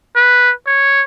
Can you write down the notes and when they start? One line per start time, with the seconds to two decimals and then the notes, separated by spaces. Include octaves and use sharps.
0.16 B4
0.67 C#5